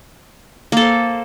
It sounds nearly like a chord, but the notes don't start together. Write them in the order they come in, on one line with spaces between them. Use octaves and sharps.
A#3 A4 C5